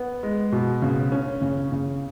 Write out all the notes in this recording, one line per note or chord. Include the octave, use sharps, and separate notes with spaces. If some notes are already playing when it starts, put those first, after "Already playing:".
Already playing: B3
G#3
B2
C#3
C#4
C#3
C#3